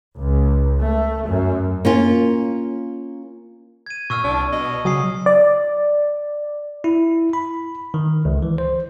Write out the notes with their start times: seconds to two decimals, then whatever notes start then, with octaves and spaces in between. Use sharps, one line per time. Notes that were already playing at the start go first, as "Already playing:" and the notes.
0.17 C#2
0.81 A3
1.27 F#2
1.85 A#3 C#4 F4
3.86 G#6 D#7
4.10 A#2 C#6 E6 F6
4.24 C2 D4
4.52 B2 D#5
4.85 C#3 F#3 G#5 D#6 C7
5.26 D5
6.84 E4
7.33 B5
7.94 D#3
8.25 C#2
8.43 E3
8.58 C5